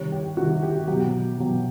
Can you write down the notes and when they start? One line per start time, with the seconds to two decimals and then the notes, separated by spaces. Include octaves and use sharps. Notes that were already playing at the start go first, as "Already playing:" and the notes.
Already playing: C3 D#3 G3 C#5
0.12 G4
0.37 C3 D#3 G3 F#4
0.63 G4
0.87 B2 F#3 G4
1.38 B2 F#3